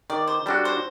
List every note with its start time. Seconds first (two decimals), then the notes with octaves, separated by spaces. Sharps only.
0.10 D#3 D5
0.28 C5
0.46 G3 D4 F#4 A4
0.65 C5